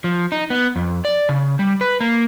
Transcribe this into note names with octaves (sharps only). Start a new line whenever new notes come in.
F3
D#4
B3
F2
D5
C#3
G3
B4
A#3